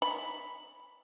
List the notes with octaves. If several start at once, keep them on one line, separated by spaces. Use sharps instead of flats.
B5